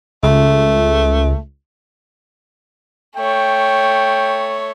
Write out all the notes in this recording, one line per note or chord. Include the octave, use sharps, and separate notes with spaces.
C#2 A3
A3 C#5 G5